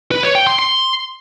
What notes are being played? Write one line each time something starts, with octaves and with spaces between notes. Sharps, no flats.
B4
C#5
G5
C6
C6